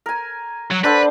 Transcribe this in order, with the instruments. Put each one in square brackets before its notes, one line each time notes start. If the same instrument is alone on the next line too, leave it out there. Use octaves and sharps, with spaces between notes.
[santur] A#4 G#5
[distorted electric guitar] F#3
[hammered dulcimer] D4 F#5 A5 [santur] A4 C5 D5 [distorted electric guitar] B4